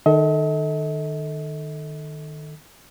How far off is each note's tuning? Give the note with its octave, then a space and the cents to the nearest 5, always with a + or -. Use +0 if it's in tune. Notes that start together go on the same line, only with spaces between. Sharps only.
D#3 -25 A4 +0 D#5 +45